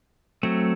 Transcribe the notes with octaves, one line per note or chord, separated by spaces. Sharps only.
F#3 A3 C4